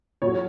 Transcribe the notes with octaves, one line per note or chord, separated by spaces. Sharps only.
A#2 F#3 C#5